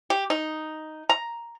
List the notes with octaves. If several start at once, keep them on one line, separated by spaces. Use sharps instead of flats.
G4
D#4
A#5